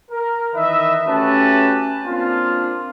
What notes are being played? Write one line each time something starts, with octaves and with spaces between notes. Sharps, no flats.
A#4
D#3 E3 B4 D#5 E5
A3 C#4 F#4 G4 B4 A5
A#3 C4 D4 F4